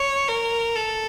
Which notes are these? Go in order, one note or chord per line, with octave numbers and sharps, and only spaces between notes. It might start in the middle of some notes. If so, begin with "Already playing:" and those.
Already playing: C#5
A#4
A4